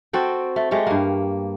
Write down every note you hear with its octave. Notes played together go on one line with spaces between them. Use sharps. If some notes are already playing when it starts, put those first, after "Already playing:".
C4 F#4 A4 G5
A3
G#3 A3 G4 C#5
G2 A#3